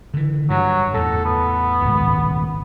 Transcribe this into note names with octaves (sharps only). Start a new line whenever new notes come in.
D3 E3
G2 F#3
E2 A2 A4
B3
D#1 G#1 C#2